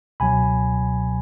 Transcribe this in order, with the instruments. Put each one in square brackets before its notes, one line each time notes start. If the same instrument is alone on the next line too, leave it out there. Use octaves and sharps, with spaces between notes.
[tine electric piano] C#2 B2 F#3 G#5 B5